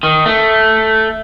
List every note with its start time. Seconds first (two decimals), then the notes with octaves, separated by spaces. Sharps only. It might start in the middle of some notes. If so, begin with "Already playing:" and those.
0.03 D#3
0.26 A3